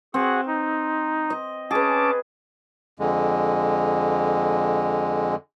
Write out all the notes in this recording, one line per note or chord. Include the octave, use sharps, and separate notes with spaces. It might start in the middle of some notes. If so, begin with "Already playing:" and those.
C4 F#4 G#4 F#5
D#4
D#5
C#4 G#4 B4 A5 D6
F2 D3 G#3